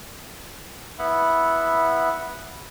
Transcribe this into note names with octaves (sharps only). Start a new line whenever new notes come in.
B3 E4 E5 F#5